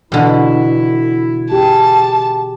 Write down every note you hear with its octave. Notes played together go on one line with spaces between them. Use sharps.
B2 D3 E3 E4
G4 G#4 A5